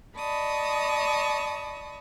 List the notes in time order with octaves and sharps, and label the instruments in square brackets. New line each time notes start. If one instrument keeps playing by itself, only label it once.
[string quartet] D5 D#5 A5 B5 C#6 D#6